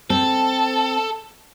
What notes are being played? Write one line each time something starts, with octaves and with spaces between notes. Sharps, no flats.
C4 A4